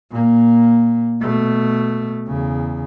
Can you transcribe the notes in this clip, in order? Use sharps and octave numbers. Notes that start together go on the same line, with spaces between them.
A#2 A#3
B2 A3
E2 C#3